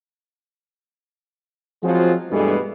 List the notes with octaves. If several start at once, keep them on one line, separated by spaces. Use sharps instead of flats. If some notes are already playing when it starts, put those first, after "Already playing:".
F3 F#3 G#3 C4 F4 F#4
G2 B2 E3 G#3 A3